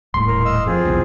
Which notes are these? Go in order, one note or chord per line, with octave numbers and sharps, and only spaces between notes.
D#1 A2 C6
A#4
D#5 F5 E6
F2 C4 F4 G#4
B1 E2